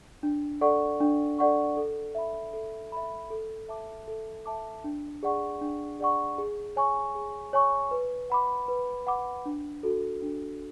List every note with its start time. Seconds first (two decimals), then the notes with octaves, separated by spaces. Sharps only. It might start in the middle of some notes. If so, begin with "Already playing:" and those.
0.23 D4
0.61 A4 D5 F#5 C#6
1.00 D4
1.39 A4 D5 F#5 C#6
1.77 A4
2.15 E5 B5
2.53 A4
2.92 E5 B5
3.30 A4
3.69 E5 A5 D6
4.08 A4
4.46 E5 A5 D6
4.84 D4
5.23 G#4 D5 F#5 C#6
5.61 D4
6.00 G#4 D5 F#5 C#6
6.38 G#4
6.76 C#5 G#5 C#6
7.15 G#4
7.53 C#5 G#5 C#6
7.91 B4
8.30 F#5 B5 D6
8.68 B4
9.07 F#5 B5 D6
9.46 D4
9.83 F#4 A4
10.22 D4